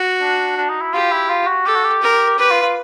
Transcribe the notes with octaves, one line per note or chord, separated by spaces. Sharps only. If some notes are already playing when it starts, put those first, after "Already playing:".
Already playing: F#4
D4
D4
D#4
E4
F4 G4
E4
F4
F#4
G4 A4
F#4
G4
A#4
G4 B4
F4
F4